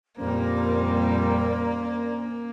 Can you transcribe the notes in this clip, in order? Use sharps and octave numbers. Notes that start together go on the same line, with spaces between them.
F2 A#2 G3 A#3 C#4 A#4 C5 D5